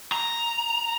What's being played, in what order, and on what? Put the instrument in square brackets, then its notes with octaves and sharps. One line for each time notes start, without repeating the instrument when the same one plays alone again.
[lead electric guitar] A#5